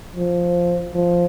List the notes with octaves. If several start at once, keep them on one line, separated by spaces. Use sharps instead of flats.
F3
F3